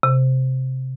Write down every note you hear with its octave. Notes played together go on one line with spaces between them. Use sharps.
C3